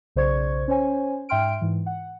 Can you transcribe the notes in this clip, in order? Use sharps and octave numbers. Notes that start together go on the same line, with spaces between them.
B1 C#3 C5 D5 C#6 G#6
C#4 C5 C#5 G#5
G#2 E5 G5 C6 F6 D7
G#2 E3
F#5